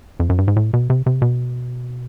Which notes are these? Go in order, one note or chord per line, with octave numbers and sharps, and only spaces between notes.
F2
F#2
G2
G#2
A2
B2
C3
C3
B2